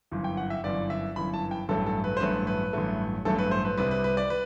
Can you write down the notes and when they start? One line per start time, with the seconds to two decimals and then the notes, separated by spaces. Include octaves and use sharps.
0.12 G1 F#2 E3
0.24 G5
0.37 F#5
0.50 E5
0.64 G1 F#2 E3 D5
0.90 E5
1.16 G1 F#2 E3 B5
1.34 A5
1.51 G5
1.69 A1 G2 F#3 A3 A4
1.86 A4
2.04 B4
2.17 C5
2.20 A1 G2 F#3 A3 B4
2.47 B4
2.73 A1 G2 F#3 A3
3.25 A1 G2 F#3 A3 A4
3.38 B4
3.51 C5
3.65 B4
3.77 C2 C3 G3 B4
3.91 B4
4.04 B4
4.17 D5
4.30 B4